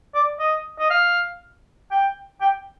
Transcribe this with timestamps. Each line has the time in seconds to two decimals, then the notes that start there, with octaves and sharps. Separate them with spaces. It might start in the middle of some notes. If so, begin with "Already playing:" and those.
0.15 D5
0.39 D#5
0.79 D#5
0.90 F5
1.91 G5
2.41 G5